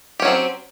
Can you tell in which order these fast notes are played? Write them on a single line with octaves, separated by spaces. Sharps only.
G4 C#4 F#3 C4